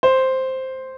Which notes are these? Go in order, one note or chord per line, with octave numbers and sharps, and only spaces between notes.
C5